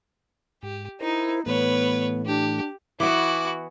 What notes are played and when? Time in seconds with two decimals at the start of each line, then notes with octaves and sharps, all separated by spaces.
0.63 G#2 G4
1.01 D#4 E4 A#4 C5
1.46 A2 E3 A3 B3 B4 C#5
2.26 D4 G4
3.00 E3 B3 E4 F#4 D6